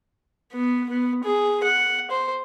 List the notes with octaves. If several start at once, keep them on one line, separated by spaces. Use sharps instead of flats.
B3
B3
G#4
F#5
C5